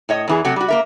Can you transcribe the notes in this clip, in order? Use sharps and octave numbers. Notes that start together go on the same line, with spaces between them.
A2 C#5 D#5
E2 E3 G#4
C3 F#3 A3 F#4
G3 F#4
A#3 A#4 E5